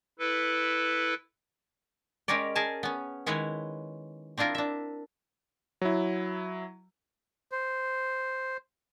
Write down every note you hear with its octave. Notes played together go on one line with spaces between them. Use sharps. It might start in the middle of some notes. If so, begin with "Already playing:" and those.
E4 A4 B4
G#3 C#4 G4 A#4 C#5 D5
G#4 A#4 G#5 A5
B3 C#4
D#3 G#3 E4 B4 C#5
C4 D4 E4 F4 A#4
D4 E5
F#3 E4
C5